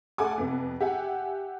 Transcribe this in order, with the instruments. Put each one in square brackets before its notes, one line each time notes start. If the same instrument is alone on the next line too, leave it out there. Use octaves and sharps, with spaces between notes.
[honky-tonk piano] A3 A4 F#5 G#5 D6
F2 C3 B3
G4 E5 F#5 G#5